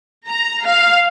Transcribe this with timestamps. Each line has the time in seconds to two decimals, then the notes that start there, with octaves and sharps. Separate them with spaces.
0.27 A#5
0.65 F5